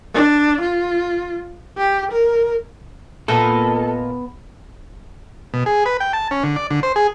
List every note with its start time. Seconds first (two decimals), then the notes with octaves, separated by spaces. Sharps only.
0.14 D4
0.61 F4
1.78 G4
2.12 A#4
3.28 A#2 B3 A4 A#4 D#5 A5
5.54 B2
5.66 G#4
5.86 B4
6.00 G5
6.13 A5
6.31 C#4
6.44 D3
6.56 D5
6.70 D3
6.83 C5
6.96 G#4